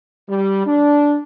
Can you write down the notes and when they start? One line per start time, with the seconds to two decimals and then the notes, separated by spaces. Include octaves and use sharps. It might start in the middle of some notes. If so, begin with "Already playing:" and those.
0.29 G3
0.67 D4